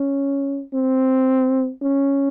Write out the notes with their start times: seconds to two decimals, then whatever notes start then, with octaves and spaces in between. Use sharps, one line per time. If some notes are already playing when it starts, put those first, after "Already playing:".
Already playing: C#4
0.74 C4
1.82 C#4